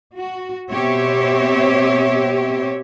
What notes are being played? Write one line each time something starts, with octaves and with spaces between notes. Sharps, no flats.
F#4
B2 C4 G4 C#5 E5